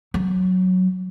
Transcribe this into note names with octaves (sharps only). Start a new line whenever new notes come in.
F#3